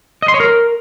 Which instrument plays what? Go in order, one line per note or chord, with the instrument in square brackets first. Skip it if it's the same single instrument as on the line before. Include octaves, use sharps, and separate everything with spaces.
[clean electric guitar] D#5
C6
C#5
A#4